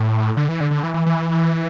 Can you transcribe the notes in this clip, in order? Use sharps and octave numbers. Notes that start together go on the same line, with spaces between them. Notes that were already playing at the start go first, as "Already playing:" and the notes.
Already playing: A2
D3
E3
D3
D3
E3
E3
E3